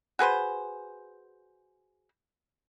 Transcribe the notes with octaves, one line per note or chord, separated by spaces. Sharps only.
F#4 G#4 B4 C5